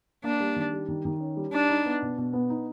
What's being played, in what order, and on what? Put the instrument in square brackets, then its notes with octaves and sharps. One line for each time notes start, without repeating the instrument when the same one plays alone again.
[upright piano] A#3 [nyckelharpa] D4
[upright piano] G3
D#3
G3
D#3
D#3
C#4
G3
[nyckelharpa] D4 [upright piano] D#4
[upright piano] D#4
B3
B2
B2
B3
D#4